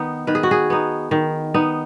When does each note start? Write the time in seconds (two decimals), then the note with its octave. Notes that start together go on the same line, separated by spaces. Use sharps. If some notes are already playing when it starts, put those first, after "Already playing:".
Already playing: D#3 B3 D#4
0.27 D#3 B4
0.35 G#4
0.43 F#4
0.51 G#4
0.70 B3 D#4
1.11 D#3
1.54 B3 D#4